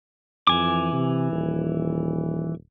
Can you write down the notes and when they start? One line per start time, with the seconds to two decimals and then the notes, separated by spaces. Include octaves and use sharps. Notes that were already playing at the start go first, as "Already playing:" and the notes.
0.47 F2 E3 G#5 D6
0.93 C3
1.32 D#1